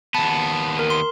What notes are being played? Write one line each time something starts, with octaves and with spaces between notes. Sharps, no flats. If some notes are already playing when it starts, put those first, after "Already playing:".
D#2 B3 A5
A#4
C6